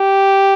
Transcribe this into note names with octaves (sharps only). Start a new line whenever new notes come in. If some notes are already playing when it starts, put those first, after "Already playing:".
Already playing: G4